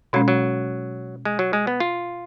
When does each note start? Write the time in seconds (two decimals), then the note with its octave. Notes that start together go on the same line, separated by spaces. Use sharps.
0.13 B2 F#3 G#3 C#4
0.28 F#3
1.25 G#3
1.39 F#3
1.53 G#3
1.67 B3
1.80 F4